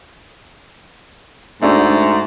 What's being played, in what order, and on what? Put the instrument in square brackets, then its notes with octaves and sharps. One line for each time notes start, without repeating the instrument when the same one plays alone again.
[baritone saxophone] G#2 [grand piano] A3 D4 F#4